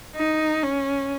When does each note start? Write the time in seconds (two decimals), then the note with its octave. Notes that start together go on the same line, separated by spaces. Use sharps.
0.15 D#4
0.63 C#4